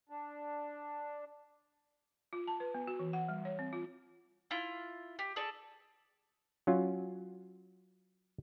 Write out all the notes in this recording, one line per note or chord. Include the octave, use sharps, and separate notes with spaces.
D4
F4
A5
B4
B3
F#4
E3
F#5
G3
C#5
C4
F4
E4 F4
G4
G#4 A4 D5
F#3 C#4 F4